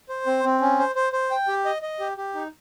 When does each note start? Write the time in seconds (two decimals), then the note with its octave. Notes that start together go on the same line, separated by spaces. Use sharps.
0.09 C5
0.26 C4
0.44 C4
0.61 C#4
0.79 C5
0.95 C5
1.13 C5
1.31 G5
1.48 G4
1.65 D#5
1.82 D#5
2.00 G4
2.17 G4
2.35 D#4